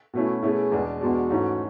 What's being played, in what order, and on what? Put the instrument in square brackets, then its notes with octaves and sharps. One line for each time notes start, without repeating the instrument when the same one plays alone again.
[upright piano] B2 A3 C#4 E4 [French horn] F#4
[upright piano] B2 A3 C#4 E4 [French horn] G#4
[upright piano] E2 B2 G#3 D4
[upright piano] E2 B2 G#3 D4 [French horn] F#4
[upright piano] G#2 E3 A3 C#4